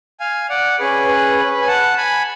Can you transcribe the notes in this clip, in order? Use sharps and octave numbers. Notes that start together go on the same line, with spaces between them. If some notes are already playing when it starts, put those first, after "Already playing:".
F5 G#5
D5 F#5
C#4 G#4 B4
B4
B4
G#5
F#5 A5
G#5 B5